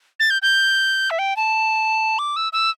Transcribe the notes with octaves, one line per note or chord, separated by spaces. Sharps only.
A6
G6
G6
E5
G5
A5
D6
E6
E6